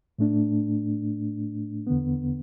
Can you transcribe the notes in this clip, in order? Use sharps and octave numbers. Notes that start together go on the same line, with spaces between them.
A2 A3 D4
E2 D3 B3